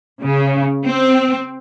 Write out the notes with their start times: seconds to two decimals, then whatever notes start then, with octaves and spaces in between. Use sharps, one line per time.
0.22 C#3
0.85 C4